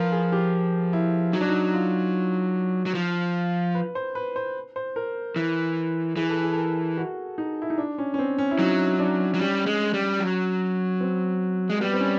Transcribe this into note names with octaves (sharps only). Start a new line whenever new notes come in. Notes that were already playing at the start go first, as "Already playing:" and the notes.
Already playing: F3 A#4 B4
G#4
G4
E4
F#3 D#4
D4
D#4
F4
F#3
F3
B4
C5
B4
C5
C5
A#4
E3
E3 G#4
A4
G#4
A4
A#4
F#4
D#4
E4
D#4
D4
C#4
C#4
C4
C#4
E4
F#3 D#4
D4
F#3
G3 C#4
G#3
G3
F#3
C4
G#3
G3 B3
C4
C#4